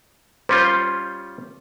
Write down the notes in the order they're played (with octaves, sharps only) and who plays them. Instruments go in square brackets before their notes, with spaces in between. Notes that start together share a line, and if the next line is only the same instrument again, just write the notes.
[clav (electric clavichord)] G3 C#4 F4 [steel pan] C5